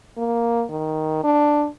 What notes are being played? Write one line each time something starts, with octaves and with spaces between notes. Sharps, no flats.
A#3
D#3
D4